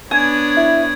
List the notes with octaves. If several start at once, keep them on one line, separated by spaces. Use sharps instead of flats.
B3 D4 C#5 G#5 G#6
E4